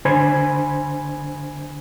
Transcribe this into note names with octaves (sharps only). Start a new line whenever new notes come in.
D3 D4 C5 G#5 B5 G#6